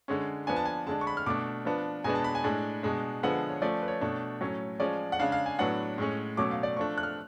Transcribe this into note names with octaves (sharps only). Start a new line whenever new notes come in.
D3 G#3 C#4
F3 B3 D4 G#5
A5
G#5
D3 G#3 D4 A5
C#6
B5
F6
B2 A3 D4 D6
F3 B3 D4
B2 G#3 B3 D4 G#5
A5
B5
G#5
A2 G#3 D4
B2 G#3 D4
D3 F3 G#3 B3 F#5
C#5
F3 A3 C#4 D5
B4
C#5
B2 A3 D4
A2 F#3 A3 C#4
F3 G#3 C#4 D5
F#5
C#3 G#3 D4 F5
F5
G#5
A2 F#3 B3 D4 F#5
A2 G#3 C#4
B2 F#3 A3 C#4 D6
F5
D5
F3 A3 D4 C#6
F#6
F6